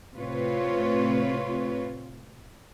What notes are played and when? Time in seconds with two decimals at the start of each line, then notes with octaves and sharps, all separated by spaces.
0.15 A2 C3 C4 F4 B4 C#5